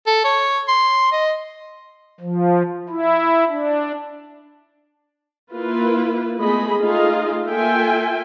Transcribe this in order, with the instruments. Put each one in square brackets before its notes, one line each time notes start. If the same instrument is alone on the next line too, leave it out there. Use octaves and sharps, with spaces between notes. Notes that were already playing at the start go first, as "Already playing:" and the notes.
[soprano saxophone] A4
C#5
C6
D#5
[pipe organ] F3
E4
D4
[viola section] A#3 E4 F4 B4
G#3 A3 B3 G#4 D#5 B5
A3 D#4 F4 G#4 D#5 F5
A#3 F4 A4 E5 G5 G#5